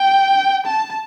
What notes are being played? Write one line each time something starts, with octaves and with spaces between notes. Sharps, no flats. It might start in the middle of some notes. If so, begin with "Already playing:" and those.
Already playing: G5
A5